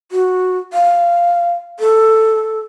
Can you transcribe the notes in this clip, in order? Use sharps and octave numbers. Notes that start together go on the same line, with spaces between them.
F#4
F5
A4